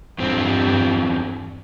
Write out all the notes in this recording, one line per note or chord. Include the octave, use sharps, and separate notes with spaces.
E2 G2 C4